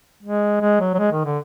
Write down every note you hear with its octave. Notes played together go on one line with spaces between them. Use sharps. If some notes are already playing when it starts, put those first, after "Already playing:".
G#3
G#3
F#3
F#3
G#3
D#3
D3